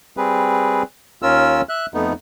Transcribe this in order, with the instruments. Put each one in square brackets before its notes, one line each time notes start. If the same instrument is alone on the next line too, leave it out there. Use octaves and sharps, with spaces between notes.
[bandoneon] G3 C4 G#4 B4
D#2 C#4 F4 A#4 E6
E5 F#6
F2 A3 B3 D#4